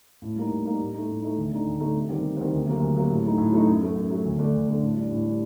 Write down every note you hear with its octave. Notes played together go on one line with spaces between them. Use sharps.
A2
G3 A#3 D#4
A2
G3 A#3 D#4
A2
A3 D#4
A2
A3 D#4
D2
D3 A3 D#4
D2
D3 A3 D#4
C3
D#3 G3 C4
C3
D#3 G3 C4
D2
C3 F#3 A#3
D2
C3 F#3 A#3
A2
F#3 A3 D#4
A2
F#3 A3 D#4
F#2
F#3 A3
F#2
F#3 A3
D2
D3 A3 D4
D2
D3 A3 D4
A2
G3 D4
A2
G3 D4